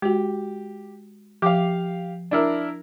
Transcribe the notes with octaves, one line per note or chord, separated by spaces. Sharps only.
G#3 F#4 G4
F3 G4 F5 D6
D4 E4 A#4